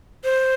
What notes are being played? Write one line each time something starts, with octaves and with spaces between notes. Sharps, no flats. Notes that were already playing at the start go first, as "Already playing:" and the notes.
C5